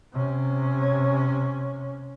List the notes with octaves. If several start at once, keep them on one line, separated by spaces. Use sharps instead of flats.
C3 C#4